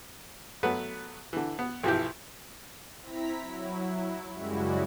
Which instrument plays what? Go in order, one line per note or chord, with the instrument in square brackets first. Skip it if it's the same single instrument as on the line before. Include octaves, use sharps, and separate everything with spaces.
[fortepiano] F#3 A3 B3 B4
D3 E3
B3
B1 E3 F3 E4 G4
[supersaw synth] C4 E4 A#5 B6
F#3 E4
F#2 C#3 G3 G#3 E4 F#4